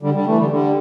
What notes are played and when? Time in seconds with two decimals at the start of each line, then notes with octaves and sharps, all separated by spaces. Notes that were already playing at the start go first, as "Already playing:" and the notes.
0.02 D3 G3
0.14 D3 G3
0.26 E3 A3
0.38 D3 G3
0.50 D3 G3